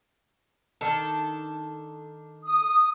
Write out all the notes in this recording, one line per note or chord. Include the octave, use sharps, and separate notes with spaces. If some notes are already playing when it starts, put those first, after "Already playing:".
D#3 D4 A4
D#6